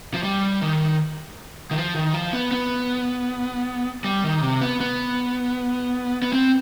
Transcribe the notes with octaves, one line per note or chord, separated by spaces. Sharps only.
F3
G3
D#3
D#3
F3
D#3
F3
B3
B3
G3
D#3
C3
B3
B3
B3
C4